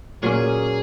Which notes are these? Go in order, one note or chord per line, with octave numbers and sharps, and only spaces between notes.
A#2 F#3 A#3 C#4 G#4